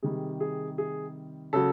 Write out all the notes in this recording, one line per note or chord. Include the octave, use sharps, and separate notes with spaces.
C3 D#3 G3 G#4
G#4
G#4
C#3 F#3 A4